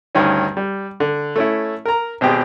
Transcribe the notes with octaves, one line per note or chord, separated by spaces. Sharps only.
D2 G2 D#3 C#4
G3
D3
A3 C#4 E4
A#4 A#5
G#1 B2 C4 G4 G#4